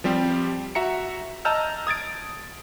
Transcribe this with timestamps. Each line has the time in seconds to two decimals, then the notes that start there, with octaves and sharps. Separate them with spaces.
0.04 F3 G3 C4 G4
0.75 F#4 E5 A#5 C#7
1.45 D#5 A5 A#5 E6 F6 G6
1.87 D#6 G#6 A6 D7